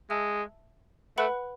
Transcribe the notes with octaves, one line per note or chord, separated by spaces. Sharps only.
G#3 E5 A5 E6
A3 B4 F#5 B5 F#6